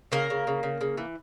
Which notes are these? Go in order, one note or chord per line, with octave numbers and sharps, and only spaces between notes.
C#3 A#3 A#4
C#3
C#3
C#3
C#3
E3